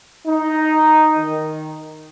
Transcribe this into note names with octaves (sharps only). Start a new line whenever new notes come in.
D#4
D#3